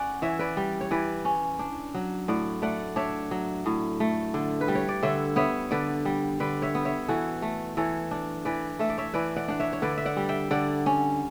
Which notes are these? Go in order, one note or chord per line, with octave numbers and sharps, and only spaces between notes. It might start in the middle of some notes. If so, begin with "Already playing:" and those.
Already playing: C#4 D5 F#5
E3 C#5 E5
B4 D5
G3
C#5
E3 B4 D5
C#4
D4
F#3
A2 D5 F#5
A3 D5 F#5
D4 C#5 E5
F#3
A2
A3
D3
B4
G3
C#5
D5
D3 C#5 E5
B3 C#5 E5
D3 B4 D5
G3
D3 B4 D5
C#5 E5
B3
C#5 E5
E3 F#4 A4
A3
E3 A4 C#5
D4
E3 B4 D5
A3 E5
D5
C#5 E5
E3 B4 D5
D5 F#5
D4 F#5
C#5 E5
C#5
D3 B4 D5
E5
D5 F#5
G3
E5 G5
D3 D5 F#5
C#4